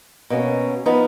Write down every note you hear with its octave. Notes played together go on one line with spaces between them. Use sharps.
B2 A#3 C#4
F3 B3 D#4